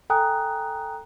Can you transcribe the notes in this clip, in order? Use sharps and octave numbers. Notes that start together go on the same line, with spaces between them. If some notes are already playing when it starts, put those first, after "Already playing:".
A4 G5 G#5 A#5 D#6 F#6